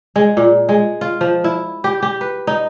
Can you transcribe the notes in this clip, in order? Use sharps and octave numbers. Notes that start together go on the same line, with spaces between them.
G#3
A#2
G#3
F4
F3
E4
G4
G4
B4
D#4